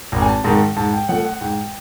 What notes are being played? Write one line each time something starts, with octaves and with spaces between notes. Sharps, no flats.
G#1
G#5
A5
G#2 D#3 A5
G#2 A5
G5
F3 A3 F#5
F#5
G#2 G5